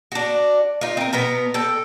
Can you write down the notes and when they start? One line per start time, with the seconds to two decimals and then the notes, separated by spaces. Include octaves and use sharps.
0.12 D4 F#4
0.81 D#4 F4
0.97 C4 A#4
1.13 B2 B3 A#4 A#5
1.54 A4 G5